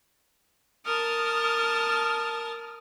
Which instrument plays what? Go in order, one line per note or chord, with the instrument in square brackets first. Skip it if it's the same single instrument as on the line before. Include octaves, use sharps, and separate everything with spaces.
[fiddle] A#4 A5 [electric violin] D#6 F6